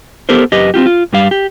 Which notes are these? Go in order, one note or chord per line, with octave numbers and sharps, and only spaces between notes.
B3 G4 A4 A#4 C5
F#2 G4 B4 D#5
C4 D4 F4 G4
F4
G2 G3 F5
G4